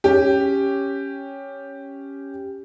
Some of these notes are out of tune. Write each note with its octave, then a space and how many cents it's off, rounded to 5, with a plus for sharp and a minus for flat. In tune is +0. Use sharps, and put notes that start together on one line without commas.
C#4 +0 G4 +0